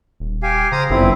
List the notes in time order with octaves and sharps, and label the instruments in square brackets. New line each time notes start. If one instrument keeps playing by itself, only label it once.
[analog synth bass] D#1
[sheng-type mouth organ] G4 F5 G#5
[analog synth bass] C#3 [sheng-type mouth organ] C5 A#5 D#6
[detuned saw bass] G1 [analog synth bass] F#2 [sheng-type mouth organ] C4 E4